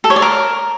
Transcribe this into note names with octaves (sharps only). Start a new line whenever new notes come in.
A4
C#5
D5
A#4